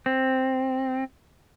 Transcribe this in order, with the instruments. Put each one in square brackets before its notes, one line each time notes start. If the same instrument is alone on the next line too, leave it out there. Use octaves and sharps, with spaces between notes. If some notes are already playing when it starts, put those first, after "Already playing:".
[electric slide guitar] C4